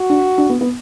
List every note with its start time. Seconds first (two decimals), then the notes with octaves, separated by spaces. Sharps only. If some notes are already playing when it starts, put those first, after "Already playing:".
Already playing: F#4
0.10 D4
0.38 D4
0.50 B3
0.61 B3